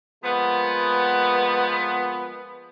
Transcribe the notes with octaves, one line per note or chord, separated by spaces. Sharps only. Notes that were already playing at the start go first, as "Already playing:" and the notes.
F3 G#3 A#3 B3